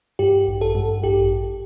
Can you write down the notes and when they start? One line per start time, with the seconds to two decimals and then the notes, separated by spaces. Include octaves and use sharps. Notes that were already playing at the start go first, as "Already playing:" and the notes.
0.19 G2 G4
0.47 A1
0.61 A4
0.75 G2
1.03 A1 G4